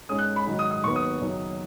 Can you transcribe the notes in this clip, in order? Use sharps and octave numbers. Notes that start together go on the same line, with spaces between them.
G#2 G#3 C#4 D#6
F#6
B5
G#2 D#3 F#3 D#4
D#6
D#6
D#2 D#3 F#3 B3 C#6
D#6
F#1 F#2 D#3